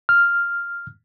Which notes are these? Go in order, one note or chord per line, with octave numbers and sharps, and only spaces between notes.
F6